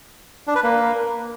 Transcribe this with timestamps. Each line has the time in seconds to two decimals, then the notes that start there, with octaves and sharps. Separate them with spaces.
0.47 D4
0.55 B4
0.63 A#3